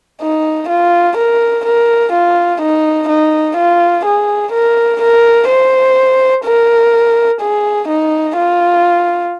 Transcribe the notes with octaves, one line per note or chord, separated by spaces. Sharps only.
D#4
F4
A#4
A#4
F4
D#4
D#4
F4
G#4
A#4
A#4
C5
A#4
G#4
D#4
F4